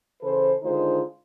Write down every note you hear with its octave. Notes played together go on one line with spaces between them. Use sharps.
C#3 E3 A4 B4 C5
D3 D#3 G#3 D#4 F4 C5